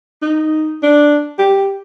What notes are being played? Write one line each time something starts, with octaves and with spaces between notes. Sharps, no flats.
D#4
D4
G4